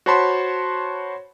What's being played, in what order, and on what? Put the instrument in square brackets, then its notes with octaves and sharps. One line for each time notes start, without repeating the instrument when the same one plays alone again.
[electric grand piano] F#4 C5 C#5 A5 B5 C6